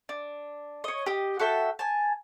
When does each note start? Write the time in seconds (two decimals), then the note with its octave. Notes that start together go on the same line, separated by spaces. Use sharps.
0.09 D4
0.84 C#5 D#5
1.06 G4 D#5
1.39 F#4 A4 E5 G5
1.79 G#5 A5